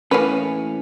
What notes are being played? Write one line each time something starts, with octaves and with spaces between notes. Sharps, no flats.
A2 E3 A#3 C#4 B4